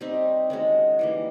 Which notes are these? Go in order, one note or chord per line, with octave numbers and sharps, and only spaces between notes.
G3 C4 D#4
D#3 G#3 C#4 F#4
E3 G3 A#3